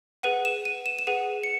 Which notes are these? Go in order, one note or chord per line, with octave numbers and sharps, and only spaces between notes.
G#4 B4 F#5 D#7
E7
D#7
E7
E7
G#4 B4 F#5 D#7
C#7